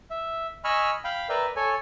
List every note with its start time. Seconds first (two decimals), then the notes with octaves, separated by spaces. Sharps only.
0.10 E5
0.64 D#5 G#5 B5 C#6 E6 F6
1.04 F5 G5 B5
1.29 A#4 B4 D5 E5 G5
1.56 A4 C#5 G#5